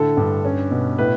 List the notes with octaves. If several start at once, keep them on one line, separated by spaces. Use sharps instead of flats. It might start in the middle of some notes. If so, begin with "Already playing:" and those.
Already playing: A2 D3 A4
G2
C#4
B2
A2 B4